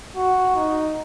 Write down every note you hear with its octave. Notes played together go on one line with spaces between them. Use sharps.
F#4
D#4